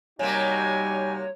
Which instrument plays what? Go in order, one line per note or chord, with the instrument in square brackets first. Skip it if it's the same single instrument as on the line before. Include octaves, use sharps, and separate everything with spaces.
[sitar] C3 A#3 [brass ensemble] G3 D#4 F#4 [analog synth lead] C#5 [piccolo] G#5